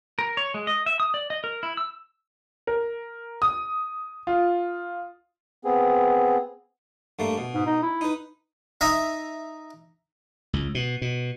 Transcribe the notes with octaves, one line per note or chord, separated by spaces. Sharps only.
A#4
C#5
G#3
D#5
E5
D#6
D5
D#5
A#4
E4
E6
A#4
D#6
F4
B3 C4 G#4
G2 A3 A#3
B2
G#2
D#4
E4
D#4 B4
D#4 E5 A#5 D#6
C#2
B2
B2